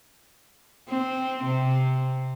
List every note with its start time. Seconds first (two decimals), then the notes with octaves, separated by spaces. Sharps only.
0.89 C4
1.44 C3